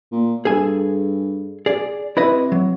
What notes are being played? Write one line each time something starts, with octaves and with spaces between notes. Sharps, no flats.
A#2
G2 G#4 A4 G#5
G#4 D5
C3 E4 B4 D#5
F#3